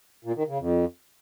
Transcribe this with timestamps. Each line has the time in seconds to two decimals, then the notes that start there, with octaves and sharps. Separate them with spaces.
0.25 A#2
0.36 D#3
0.48 C#3
0.59 F2